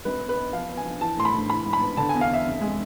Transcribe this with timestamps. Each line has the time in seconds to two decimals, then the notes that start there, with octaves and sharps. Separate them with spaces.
0.05 G#1 B4
0.21 B3
0.29 B4
0.37 B3
0.53 F3 F5
0.69 B3
0.77 G#5
0.85 F3
1.01 E3 A5
1.17 A2 C6
1.25 B5
1.33 A2
1.50 E3 B5
1.65 G#2
1.73 B5
1.81 B3
1.97 D3 A5
2.09 G#5
2.14 E2
2.21 F5
2.30 E2 E5
2.45 F1
2.61 G#3